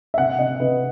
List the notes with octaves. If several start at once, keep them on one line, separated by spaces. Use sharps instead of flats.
E5
C3 F#5
C3 D#5
C3 B4